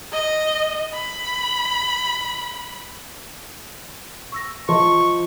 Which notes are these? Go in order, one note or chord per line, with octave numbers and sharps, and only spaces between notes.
D#5
B5
C#6 E6 A#6
F3 D#5 A5 C6 C#6